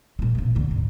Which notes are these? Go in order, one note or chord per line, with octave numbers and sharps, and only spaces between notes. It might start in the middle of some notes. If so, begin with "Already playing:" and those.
A#2 G3
B1 C#3
C#2 D3
G#2